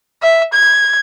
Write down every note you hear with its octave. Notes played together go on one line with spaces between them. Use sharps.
E5
G#6